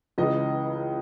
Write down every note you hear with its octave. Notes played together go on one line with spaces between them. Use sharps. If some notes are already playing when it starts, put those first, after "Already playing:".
C#2 C#3 E3 D#5